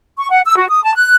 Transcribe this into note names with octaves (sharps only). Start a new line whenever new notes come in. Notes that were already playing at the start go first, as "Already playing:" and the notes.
C#6
F#5
E6
F#4
D#6
A5
F#6